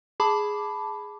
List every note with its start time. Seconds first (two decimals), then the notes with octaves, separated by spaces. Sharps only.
0.20 G#4 A5 B5 D6